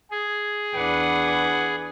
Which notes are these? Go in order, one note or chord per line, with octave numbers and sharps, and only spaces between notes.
G#4
E2 D4 B4 F#5